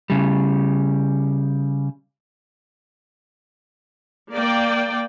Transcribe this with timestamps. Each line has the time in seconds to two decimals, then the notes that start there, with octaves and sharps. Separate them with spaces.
0.10 C#3 G3
4.33 A#3 D5 G5